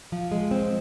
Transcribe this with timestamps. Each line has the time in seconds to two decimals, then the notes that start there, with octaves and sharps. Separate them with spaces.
0.12 F3
0.32 G#3
0.51 C4